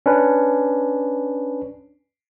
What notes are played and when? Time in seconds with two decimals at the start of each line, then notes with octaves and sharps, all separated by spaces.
0.06 C#4 D4 B4